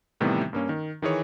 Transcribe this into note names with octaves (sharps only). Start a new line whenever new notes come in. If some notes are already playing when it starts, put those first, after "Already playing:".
A2 C3 D#3 E3 G3 B3
G2 A#3 C#4
D#3
D#3 E3 G#4 C#5